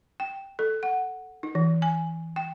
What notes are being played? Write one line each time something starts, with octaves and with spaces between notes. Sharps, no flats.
G5
A4
F#5
D#4
E3
G#5
G5